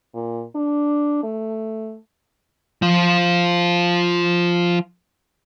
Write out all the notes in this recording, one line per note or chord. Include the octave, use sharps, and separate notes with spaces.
A#2
D4
A3
F3 F4